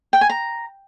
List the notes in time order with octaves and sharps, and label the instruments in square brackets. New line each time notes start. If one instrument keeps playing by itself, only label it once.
[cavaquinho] G5
G#5
A#5